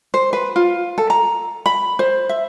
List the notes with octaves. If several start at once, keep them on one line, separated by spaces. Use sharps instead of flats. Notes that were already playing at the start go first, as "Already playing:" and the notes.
C5
B4
F4
A4
A#5
B5
C5
E5